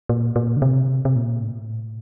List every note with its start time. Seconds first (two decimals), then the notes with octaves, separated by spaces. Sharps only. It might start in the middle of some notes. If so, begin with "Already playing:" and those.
0.09 A#2
0.36 A#2
0.57 D3
0.62 C3
1.05 C3
1.16 A#2
1.42 A2
1.51 A#2
1.58 A2